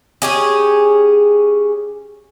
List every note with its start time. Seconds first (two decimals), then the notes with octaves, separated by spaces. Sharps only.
0.22 C#4 G4 G#4